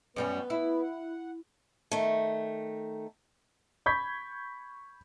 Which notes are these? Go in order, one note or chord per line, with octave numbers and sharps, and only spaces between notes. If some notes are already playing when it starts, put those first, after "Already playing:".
F#2 G3 B3 C#4 B4
E4
F#5
D#3 A3
B5 C#6 G6 G#6 B6